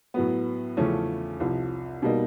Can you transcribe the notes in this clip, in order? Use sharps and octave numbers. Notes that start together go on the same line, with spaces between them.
A2 F#3 B3
E2 C#3 F3 A3 C#4
C2 C3 F3
B2 G3 A#3 D#4